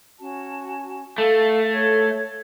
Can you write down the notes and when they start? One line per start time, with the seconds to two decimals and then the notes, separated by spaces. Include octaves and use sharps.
0.19 C#4 F#4 A5
1.18 A3 A4 F5
1.72 A4 C#5 G#6